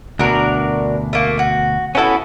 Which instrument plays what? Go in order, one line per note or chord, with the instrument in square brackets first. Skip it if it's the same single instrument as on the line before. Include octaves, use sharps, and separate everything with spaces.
[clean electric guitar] D2 B2 [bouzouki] D4 F#4 A#4
[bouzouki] A3 A#3
F#4
[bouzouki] B3 E4 F#4 [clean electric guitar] C#4 A4